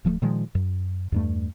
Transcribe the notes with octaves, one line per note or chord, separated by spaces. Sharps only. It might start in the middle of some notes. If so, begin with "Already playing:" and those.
D1 F3 F#3 A3
A#2 D#3 F3 G#3
F#2
E2 G2 A3